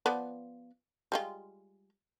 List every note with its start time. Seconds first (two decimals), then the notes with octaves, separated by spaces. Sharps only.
0.06 F3 B3 D5
1.12 G3 G#3 F4